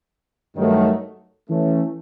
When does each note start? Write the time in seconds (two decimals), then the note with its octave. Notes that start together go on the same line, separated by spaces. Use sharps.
0.55 G2 D#3 F#3 A3
1.49 E3 A3 C#4